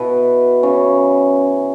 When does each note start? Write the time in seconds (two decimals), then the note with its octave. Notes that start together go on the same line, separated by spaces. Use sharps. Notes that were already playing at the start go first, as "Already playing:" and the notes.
Already playing: B2 B3 E4 B4
0.63 C#3 E3 C#4